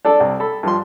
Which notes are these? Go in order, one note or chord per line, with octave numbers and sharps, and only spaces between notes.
D4 A4 D5 A5
C2
A4 B5
G2 F3 C6